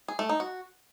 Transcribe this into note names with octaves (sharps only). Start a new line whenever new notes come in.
G#4
A3
D#4
F#4